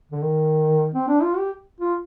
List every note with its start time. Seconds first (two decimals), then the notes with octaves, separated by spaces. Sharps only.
0.11 D3
0.22 D#3
0.94 C4
1.08 D4
1.22 F4
1.37 G4
1.81 F4